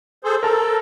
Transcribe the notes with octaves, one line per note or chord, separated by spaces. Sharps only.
G#4 A4 C5
A4 A#4 A5 A#5